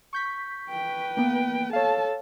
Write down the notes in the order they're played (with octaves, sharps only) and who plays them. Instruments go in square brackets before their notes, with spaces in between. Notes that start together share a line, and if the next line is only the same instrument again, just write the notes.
[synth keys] C#6 G6 B6
[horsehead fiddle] B4 G5
[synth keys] A#3 B3
[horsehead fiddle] A4 A5 [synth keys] C#5 F5